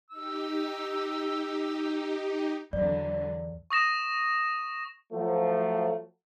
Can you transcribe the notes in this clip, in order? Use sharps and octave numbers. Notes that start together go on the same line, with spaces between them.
D#4 G4 E6
E2 D3 E3 F#3 D5
C#6 D#6 A#6 E7
F3 F#3 A3